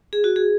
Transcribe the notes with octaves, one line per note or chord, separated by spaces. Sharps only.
G#4
F#4
G#4